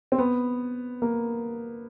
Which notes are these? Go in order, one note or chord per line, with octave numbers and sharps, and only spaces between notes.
C4
B3
A#3